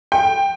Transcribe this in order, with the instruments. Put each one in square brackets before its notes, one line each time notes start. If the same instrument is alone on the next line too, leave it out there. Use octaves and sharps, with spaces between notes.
[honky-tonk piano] G5